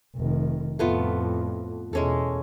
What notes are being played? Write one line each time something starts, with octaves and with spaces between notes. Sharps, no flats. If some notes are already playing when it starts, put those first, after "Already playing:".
F1 D#3
F2 A2 A3 B3 F4
E2 B2 G#3 C#4 A4